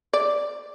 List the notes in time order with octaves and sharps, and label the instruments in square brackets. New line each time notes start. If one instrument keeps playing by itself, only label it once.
[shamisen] D5